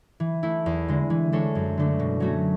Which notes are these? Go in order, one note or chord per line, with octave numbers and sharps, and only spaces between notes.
E3
A3 E4
E2
D3 G#3
E3
G#3 D4 A4 C#5
F#2
D3 A3 D4 A4
B2
F#3 A3 C#4 F#4